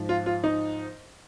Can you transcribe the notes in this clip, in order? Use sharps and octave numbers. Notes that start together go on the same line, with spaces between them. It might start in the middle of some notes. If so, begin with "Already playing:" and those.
Already playing: G#2 F3
F4
F4
D#4